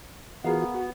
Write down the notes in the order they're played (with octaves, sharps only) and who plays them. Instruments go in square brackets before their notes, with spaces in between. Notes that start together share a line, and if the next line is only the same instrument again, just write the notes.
[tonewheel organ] E3 F4 F#4 [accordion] B3 [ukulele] G#4 A#4 F5
[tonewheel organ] F#4